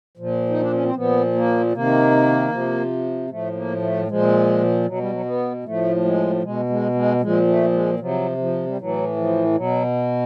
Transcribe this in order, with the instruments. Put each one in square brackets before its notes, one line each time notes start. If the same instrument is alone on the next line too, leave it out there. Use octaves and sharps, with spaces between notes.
[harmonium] A#2 F3
D#4
D4
C#4
C4
A#2 F3 B3
A#3
C3 D#3 A#3
C3 F3
A2 F3 A3
A#3
A3
A#2 F3 G#3
B2 F#3
G3
F#3
B3
A2 F3 A3
G#3
B2 G#3
G#3
G#3
A#2 F3 G#3
A3
G#3
C3 F3 F#3
F3
G3
A2 E3 F#3
F3
B2 F#3